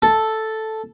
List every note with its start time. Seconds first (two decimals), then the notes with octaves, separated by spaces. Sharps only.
0.02 A4